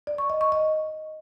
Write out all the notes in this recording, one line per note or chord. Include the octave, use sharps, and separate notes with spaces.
D5
C#6
D#5
C#6
D#5